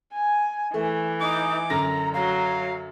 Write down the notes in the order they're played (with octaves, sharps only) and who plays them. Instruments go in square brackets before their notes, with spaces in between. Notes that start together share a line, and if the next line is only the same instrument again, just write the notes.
[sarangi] G#5
[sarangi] E3 [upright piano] A3
[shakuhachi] D#4 [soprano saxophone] D6
[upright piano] F#2 D3 A#6 [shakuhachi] A#5
[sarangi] F#3 [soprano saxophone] F5 [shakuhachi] A#5